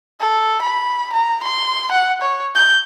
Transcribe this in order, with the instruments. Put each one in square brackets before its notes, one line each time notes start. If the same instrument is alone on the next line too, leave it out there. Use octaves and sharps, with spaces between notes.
[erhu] A4
B5
A#5
C6
F#5
C#5
G6